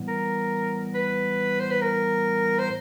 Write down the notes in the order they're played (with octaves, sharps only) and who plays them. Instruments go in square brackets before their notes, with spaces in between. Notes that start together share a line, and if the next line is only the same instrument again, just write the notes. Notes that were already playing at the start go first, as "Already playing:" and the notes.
Already playing: [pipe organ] A2 E3 G3 B3
[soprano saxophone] A#4
B4
C5
B4
A#4
C5